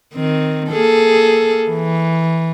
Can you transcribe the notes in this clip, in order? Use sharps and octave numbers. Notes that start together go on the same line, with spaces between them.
D#3 C4
A#3 G#4 A4
E3